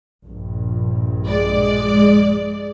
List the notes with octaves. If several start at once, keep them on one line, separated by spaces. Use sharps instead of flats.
A#1 G2
G#3 D5